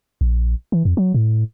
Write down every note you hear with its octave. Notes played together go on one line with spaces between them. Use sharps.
A#1
E3
F2
F#3
A2